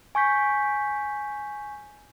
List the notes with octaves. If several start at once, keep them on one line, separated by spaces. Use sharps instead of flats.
G#5 C#6 G6 B6